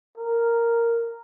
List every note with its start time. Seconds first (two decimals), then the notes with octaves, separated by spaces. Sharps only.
0.18 A#4